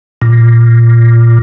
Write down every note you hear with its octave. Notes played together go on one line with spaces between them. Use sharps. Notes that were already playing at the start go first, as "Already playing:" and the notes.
A#2